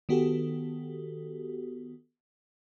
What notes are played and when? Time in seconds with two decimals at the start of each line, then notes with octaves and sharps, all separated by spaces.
0.09 D#3 B3 F#4 G4 A4